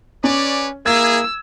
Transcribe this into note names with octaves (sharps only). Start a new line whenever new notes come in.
C#4 B4 C#5 D5
A#3 E4 G#4 E6 G#6